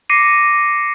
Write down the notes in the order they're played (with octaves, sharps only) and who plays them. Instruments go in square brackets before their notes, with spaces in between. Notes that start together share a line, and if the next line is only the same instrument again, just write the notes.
[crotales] D6 A#6 C7 C#7 D#7